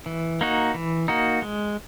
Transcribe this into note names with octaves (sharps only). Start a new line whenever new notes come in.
E3
A#3 D#4 F#4
E3
A#3 D#4 F#4
G#3